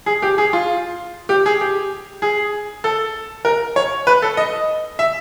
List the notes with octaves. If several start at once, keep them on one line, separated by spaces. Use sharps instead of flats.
G#4
G4
G#4
F4
G4
G#4
G4
G#4
A4
A#4
C#5
B4
A4
D#5
E5